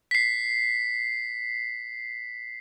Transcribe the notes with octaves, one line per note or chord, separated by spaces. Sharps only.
B6 C7